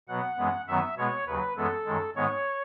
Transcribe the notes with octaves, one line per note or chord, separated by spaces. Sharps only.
B2 F#3 B3 F#5
F#2 E3 G#3 B3
F#2 D#3 F#3 B3 E5
B2 G#3 B3 C#5
D#2 C#3 F#3 B4
F#2 E3 G#3 B3 A4
F#2 D#3 G#3
G#2 D#3 G#3 B3 C#5